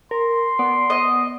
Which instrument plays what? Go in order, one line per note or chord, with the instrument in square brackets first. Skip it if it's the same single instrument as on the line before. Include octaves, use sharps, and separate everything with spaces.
[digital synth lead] A#4 [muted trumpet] C6
[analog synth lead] B3 [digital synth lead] D5
[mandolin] D#5